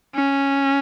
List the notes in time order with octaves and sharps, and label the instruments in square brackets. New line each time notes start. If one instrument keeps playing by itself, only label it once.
[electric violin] C#4